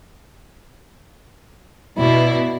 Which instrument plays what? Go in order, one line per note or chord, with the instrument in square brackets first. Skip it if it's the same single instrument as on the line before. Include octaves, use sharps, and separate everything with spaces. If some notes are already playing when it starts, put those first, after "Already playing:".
[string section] B2 [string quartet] E4 D5